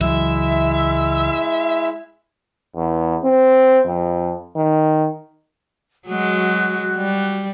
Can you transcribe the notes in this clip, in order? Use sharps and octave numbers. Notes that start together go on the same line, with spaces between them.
C#2 E3 F#3 G#3 E4 E5
E2
C4
F2
D#3
F#3 G#3 F#4
G3